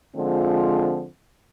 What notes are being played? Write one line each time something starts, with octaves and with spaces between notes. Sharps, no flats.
D3 F3 G#3 C4 F4